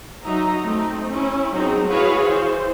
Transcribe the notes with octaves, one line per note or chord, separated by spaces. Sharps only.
F#3 D#4 E5 A#5
A3 C4 D#4
C#4 E4
F#3 C4 D#4 G#4 A#5
E4 F#4 G#4 B4 C#5 F5
E3 C5